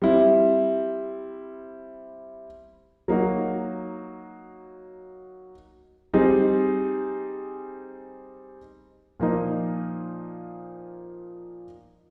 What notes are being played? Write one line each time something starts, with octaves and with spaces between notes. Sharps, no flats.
G3 C4 E4
F#3 A#3 D#4 F#4
G3 C4 D#4 G#4
A#2 F3 A#3 D#4